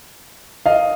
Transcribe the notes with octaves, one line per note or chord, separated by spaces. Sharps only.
D#5 F5